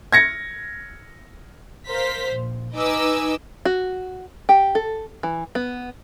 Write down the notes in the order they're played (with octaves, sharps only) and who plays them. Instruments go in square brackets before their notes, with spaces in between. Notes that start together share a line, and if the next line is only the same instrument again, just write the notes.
[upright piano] G#6 A#6 C#7
[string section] A#4 C5 F5 B6
A#1
D#4 B4 D#5 G#5 D6 E6
[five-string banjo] F#4
G4
A4
E3
B3